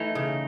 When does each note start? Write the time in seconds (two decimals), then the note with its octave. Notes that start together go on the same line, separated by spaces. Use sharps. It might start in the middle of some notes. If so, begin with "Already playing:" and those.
Already playing: E3 A3 D#4
0.15 C#3